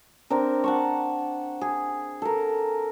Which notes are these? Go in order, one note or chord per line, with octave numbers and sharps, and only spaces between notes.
C4 D4 A#4
F#5 A5 C#6
G#4
A4 A#4